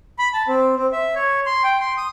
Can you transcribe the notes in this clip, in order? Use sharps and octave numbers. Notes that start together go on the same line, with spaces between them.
B5
A5
C4
C4
E5
C#5
C6
G5
C6
D#6